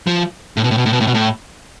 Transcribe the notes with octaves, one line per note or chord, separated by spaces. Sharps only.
F3
A2
B2
A2
B2
A2
B2
A2
B2
A2